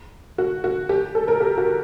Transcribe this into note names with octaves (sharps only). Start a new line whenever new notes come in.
F#4
F#4
G4
A4
A#4
G4
F#4